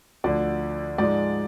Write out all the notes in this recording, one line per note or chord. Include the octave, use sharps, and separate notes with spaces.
D2 D3 F3 D5
G#2 F3 G#3 D5